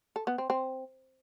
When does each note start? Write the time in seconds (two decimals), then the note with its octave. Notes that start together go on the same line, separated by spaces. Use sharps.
0.16 A4
0.27 B3
0.38 C4
0.50 C4